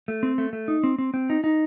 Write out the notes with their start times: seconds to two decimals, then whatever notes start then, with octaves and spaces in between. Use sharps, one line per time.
0.08 A3
0.23 C4
0.38 A3
0.53 A3
0.68 D#4
0.84 C4
0.98 C4
1.14 C4
1.30 D#4
1.44 D#4